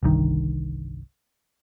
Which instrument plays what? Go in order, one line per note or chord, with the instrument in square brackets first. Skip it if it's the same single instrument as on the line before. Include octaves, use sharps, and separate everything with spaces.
[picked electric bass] G1 C2 G2 D#3